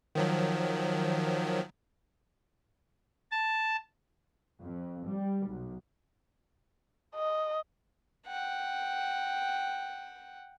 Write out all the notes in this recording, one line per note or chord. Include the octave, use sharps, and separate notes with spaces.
D#3 F3 F#3
A5
F2
G3
B1
D#5
F#5 G5